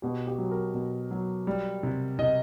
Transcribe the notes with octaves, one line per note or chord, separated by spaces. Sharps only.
B2 G4
G4
F#3
A#4
B2
F#3
G3
C3
C3 D#5